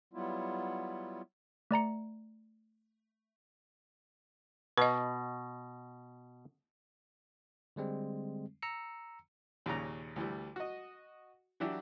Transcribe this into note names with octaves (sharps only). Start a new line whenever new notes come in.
F#3 G3 B3 E4 F4
A3 D5 A#5 C#7
B2 B4 D#5
D3 G3 G#3 C4
A#5 E6 C#7
D#2 A#2 C#3 A#5
D2 E3 G3
F#4 D#5
E3 F#3 D4 E4 F#4 G4